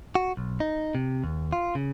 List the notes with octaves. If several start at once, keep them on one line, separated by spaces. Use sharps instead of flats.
F#4
B1
D#4
C3
D#2
F4
C#3